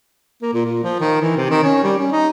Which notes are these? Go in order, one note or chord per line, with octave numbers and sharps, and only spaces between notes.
A#3
A#2
A#2
F3
D#3
E3
C3
D#3
C#4
G3
C#4
D#4